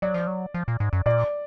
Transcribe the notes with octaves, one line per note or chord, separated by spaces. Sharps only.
F#3 D5
F3
F#3
F3
A#2
G#2
F#2
A#2 D5